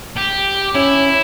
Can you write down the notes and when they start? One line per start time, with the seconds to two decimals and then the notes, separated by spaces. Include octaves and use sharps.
0.17 G4
0.74 C#4 E4